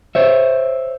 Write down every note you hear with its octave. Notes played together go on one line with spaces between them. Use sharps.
C5 C#5 E5